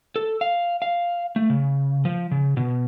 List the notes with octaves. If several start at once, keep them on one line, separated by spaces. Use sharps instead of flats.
A4
F5
F5
A3
C#3
F3
C#3
B2